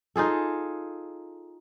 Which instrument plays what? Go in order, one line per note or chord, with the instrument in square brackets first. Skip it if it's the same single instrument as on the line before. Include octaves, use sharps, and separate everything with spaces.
[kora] D#4 F4 G#4 A4